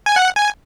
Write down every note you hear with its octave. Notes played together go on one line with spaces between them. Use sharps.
G#5
F#5
G#5